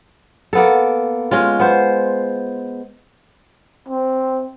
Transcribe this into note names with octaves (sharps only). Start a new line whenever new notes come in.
A#3 B3 A4
G#3 C#4 F4
B3 C5
C4